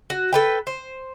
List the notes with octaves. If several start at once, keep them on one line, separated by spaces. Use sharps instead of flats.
F#4
A4 B4 G5
C5